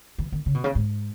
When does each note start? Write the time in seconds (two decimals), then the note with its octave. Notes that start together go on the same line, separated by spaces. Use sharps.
0.18 E3
0.32 D#3
0.46 C#3
0.55 B2
0.64 C#3
0.75 G#2